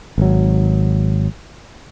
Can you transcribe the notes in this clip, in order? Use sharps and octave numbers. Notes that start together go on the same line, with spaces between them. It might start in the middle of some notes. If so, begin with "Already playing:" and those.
G#1 F#3